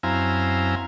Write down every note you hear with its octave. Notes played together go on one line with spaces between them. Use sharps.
F#2 C4 E4 F5 G#5 A#5